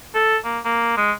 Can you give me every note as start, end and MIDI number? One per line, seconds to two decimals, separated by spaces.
0.15 0.37 69
0.45 0.59 58
0.65 0.93 58
0.97 1.12 56